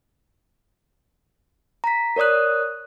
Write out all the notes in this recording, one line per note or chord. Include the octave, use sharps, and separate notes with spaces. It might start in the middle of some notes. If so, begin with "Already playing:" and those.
A#5 B6
A#4 C#5 D5 D#6 F#6